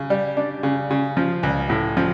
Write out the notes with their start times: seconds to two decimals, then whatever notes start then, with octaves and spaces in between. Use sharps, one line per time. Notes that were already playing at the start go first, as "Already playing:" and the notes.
Already playing: C#3
0.10 G3
0.37 D4
0.63 C#3
0.90 C#3
1.17 F3
1.43 C#2
1.70 A2
1.97 F3